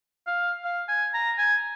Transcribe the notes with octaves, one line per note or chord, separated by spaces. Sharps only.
F5
F5
G#5
A#5
G#5